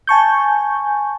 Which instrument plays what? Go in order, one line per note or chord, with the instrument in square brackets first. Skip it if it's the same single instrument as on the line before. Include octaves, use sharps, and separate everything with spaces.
[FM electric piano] G#5 A5 C#6 G6